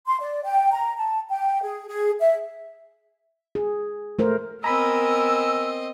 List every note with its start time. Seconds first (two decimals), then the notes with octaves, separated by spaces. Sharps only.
0.07 C6
0.20 D5
0.44 G5
0.72 A#5
0.96 A5
1.29 G5
1.62 G#4
1.88 G#4
2.19 E5
3.55 G#4
4.19 A3 A#4 C5
4.64 B3 C4 A#4 D#5 G#5 A#5 B5 E6